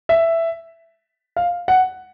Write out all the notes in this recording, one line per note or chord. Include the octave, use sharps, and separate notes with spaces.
E5
F5
F#5